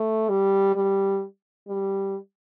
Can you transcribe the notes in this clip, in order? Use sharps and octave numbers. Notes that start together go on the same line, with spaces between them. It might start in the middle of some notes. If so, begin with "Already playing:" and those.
Already playing: A3
G3
G3
G3